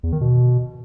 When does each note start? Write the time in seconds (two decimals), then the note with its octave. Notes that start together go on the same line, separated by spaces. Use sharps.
0.03 E2
0.12 D#3
0.21 B2